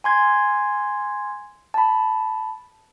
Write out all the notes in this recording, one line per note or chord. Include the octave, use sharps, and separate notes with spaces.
G#5 C6 G#6
A5 B5